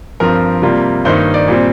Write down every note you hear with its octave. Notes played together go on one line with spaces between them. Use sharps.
G2 F3 C4 F4 A#4
C3 G3 A#3 F4
G2 D#3 A#3 D#4 C5
D5
A#2 G3 C4